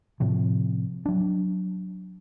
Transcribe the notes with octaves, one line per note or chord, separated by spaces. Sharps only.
A2 C3 F3
F#3 D4